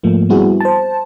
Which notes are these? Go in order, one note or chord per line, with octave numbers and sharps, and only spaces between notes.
G#2 F3 A3 A#3
G3 B3 C4 E4 F#4 G#4
C5 A5